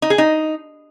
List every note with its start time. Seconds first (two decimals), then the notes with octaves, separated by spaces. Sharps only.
0.02 D#4
0.10 G#4
0.18 D#4